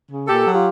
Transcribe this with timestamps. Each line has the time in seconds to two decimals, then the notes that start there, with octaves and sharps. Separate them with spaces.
0.10 C#3
0.28 A#2 G4 A4
0.46 F#3
0.54 F4 G4